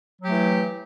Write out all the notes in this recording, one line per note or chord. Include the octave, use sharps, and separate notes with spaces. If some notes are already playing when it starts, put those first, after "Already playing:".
E3 F#3 A3 G4